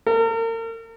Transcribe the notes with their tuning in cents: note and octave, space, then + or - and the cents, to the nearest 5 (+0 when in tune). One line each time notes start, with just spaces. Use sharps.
A#4 -40